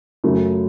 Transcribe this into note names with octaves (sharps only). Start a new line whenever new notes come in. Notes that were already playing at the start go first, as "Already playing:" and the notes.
F#2 C#3 F#3 A3